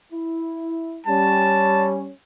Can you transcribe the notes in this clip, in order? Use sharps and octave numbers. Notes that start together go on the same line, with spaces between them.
E4
G3 C#4 A5